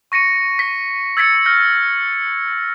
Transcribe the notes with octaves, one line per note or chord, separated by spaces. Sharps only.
C#6 A#6 C#7 D#7
B6
E6 G#6 A6 B6 C#7
F6 G6 A#6